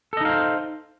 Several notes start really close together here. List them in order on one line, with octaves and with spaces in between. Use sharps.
A4 D#5 D#4 F5 C5